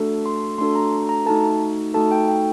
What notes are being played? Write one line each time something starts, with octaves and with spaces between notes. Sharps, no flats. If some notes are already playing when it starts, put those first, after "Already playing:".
Already playing: A3 D4 F#4 A4
C6
A3 D4 F#4 A4 C6
A#5
A#5
A3 D#4 F#4 A4 A5
A3 D#4 F#4 A4 A5
G5
G5